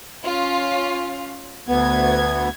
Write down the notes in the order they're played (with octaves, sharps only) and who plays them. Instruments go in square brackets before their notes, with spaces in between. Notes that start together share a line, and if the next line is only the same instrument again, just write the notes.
[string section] C#4 F4
[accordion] D2 B3 [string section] G#6